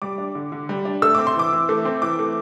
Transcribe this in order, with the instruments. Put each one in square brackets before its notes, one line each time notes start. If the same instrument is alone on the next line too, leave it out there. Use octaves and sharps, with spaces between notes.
[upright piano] G3 D6
D4
D3
D3
G3
D4
A3 E6
C4 D6
C6
E3 D6
E3
A3
C4
E3 D6
A3